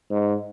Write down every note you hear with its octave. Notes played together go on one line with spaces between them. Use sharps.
G#2